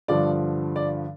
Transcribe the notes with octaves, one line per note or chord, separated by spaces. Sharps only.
G2 D3 F3 D5
D5